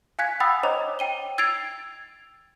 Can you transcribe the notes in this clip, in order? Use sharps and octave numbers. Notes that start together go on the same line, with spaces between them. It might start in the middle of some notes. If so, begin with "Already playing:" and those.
F5 G#5 F#6 G#6 B6
F#5 G5 B5 D#6 E6 A6
C5 C#5 D#5 A#5 D6 F7
G5 D#7 G7
E6 G#6 A6 C7 D7 F7